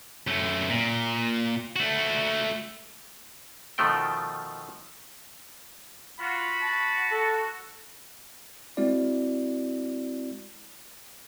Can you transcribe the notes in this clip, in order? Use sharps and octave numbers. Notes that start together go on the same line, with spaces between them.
F#2 A3
A#2
A3 F#4
B2 D#3 F3 A3 G5
F4 F#4 B5
A5
A4
G#3 C4 E4 F#4 D5